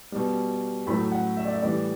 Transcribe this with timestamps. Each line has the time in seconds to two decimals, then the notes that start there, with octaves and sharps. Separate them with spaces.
0.12 B2 G3
0.87 A2 F#3 A3 B5
1.12 F#5
1.37 E5
1.45 D5
1.53 E5
1.62 A2 E3 G3 D5